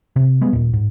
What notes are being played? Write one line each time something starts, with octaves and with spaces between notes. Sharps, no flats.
C3
G3 G#3 B3
D#2 A#2
G#2